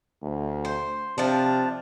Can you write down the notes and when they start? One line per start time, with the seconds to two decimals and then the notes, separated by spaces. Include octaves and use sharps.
0.23 D2
0.65 C5
1.18 C3 F3 D4